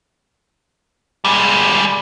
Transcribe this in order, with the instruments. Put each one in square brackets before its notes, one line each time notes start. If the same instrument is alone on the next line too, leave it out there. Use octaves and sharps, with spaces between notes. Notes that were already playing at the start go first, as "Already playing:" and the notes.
[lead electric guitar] G3 G#3